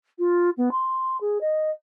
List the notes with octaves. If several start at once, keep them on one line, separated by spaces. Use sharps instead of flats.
F4
B3
C6
G#4
D#5